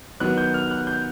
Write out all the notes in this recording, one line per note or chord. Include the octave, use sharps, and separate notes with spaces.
D#3 F#3 B3 F#6
G6
F6
F#6
G6